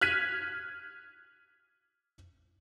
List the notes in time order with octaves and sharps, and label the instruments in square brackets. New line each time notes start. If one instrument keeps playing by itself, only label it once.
[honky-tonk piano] F6 F#6 G#6 B6 D#7